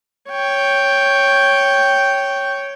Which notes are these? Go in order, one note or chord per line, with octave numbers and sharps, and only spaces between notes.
C#5 G5